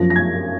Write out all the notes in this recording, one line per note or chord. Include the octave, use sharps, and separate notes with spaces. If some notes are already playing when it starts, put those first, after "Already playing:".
Already playing: F#2 F3 A#6
A#6
G#6